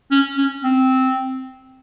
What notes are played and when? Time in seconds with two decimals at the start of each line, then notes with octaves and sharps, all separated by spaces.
0.11 C#4
0.37 C#4
0.64 C4